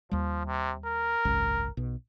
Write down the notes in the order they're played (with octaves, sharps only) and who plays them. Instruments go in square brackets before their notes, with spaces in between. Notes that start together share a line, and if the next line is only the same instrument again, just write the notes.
[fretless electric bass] D#2 G3 [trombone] F3
[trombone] C3
A#4
[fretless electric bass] G#1 C#2 F#2
B1 B2